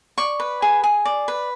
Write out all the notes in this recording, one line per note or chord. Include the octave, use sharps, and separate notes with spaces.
D5 C#6
B4
G#4
G#4
D5
B4